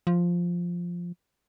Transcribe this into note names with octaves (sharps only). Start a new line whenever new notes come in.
F3